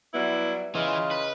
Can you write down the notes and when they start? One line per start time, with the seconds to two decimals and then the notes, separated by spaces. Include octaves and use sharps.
0.13 F#3 G3 B3 E4
0.75 C#3 E3 F4 D#5
1.11 B4